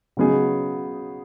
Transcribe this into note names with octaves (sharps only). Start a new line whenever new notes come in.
C#3 F#3 B3 D#4 G#4